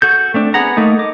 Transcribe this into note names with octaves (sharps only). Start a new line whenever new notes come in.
F#4 A4 G6
A3 C4 D4
B3 G#4 F#5 A#5
A3 A#3 D#4
D#5 D6